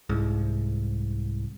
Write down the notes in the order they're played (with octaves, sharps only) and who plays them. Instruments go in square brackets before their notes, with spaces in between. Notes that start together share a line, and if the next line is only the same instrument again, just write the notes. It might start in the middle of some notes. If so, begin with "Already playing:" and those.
[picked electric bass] C2 G#2